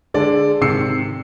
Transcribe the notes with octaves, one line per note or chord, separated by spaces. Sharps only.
D3 G#3 A4 D5
G#2 C3 D#3 E6 C7 C#7